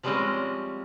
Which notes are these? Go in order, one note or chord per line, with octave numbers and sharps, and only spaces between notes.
F3 G3 G#3 C4 C#4 D#5